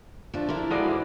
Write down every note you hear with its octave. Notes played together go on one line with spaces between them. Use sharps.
F3 A3 D4
D4 E4 F4 A4 A#4
A2 G#3 F#4 B4 D5 F5
G#2 E3